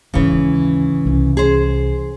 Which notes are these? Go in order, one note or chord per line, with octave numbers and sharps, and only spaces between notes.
D#2 G#2 C#3 E3
C2 C#4
G#4 C5